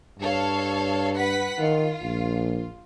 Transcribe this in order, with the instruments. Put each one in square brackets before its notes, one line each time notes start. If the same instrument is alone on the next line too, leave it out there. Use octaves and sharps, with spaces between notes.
[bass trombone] G2 [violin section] A4 C#5 F5
[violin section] B4 F#5 B6
[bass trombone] D#3 [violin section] F4
[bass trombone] A#1